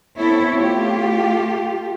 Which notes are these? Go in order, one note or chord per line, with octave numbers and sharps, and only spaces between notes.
B3 C4 E4 A4 C#5
A3 F4 G4